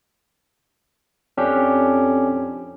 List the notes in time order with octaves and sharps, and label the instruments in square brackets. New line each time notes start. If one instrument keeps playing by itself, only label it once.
[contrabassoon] F2 [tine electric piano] C#4 D4 G4